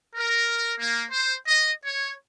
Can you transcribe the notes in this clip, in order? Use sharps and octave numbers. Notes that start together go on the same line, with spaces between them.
A#4
A#3
C5
D#5
C#5